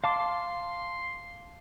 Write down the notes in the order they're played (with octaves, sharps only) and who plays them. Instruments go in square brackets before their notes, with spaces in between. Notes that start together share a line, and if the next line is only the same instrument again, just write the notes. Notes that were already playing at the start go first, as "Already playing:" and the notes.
[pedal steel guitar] F5 A5 D6 [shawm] C6